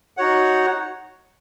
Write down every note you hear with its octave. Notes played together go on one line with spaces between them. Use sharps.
D#4 F#4 C#5 F#5